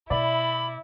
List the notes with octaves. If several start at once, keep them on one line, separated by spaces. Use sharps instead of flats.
B2 E4 D5 E5 B5